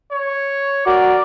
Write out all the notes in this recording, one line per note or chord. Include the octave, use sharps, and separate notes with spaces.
C#5
F#4 A#4 D5